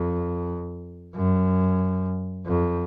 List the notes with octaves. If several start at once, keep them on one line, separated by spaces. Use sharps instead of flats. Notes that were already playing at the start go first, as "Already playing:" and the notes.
Already playing: F2
F#2
F2